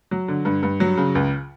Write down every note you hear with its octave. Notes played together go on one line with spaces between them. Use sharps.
F#3
D3
G2
G2
F#3
C#3
C#2